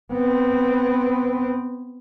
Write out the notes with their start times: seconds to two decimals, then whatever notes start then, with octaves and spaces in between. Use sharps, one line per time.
0.13 B3 C4